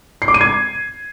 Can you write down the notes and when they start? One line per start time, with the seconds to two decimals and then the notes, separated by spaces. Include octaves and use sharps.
0.22 C7
0.28 D6
0.34 D#7
0.41 G#6